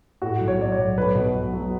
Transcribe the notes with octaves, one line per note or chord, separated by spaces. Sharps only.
A2 F#4
B1
C#5
F#3 D5
C#5
B1
B1 B4
B2
B1
F#3